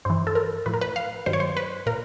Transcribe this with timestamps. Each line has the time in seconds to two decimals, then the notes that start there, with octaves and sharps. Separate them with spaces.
0.05 G2 E3 C5
0.27 A4
0.35 A#4
0.66 A2 F3 B4
0.74 A#4
0.81 B4
0.96 F5
1.26 G2 D#3 F#3 C5
1.33 C#5
1.40 C5
1.57 B4
1.86 A#2 A#4